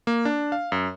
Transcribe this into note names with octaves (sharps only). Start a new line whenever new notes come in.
A#3
D4
F5
F#2